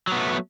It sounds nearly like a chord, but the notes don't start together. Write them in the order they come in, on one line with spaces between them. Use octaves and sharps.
F#3 B3 A3